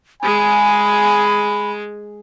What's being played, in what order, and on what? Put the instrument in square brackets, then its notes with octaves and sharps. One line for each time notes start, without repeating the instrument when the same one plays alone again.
[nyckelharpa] G#3 G#4 [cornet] G#5 [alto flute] B5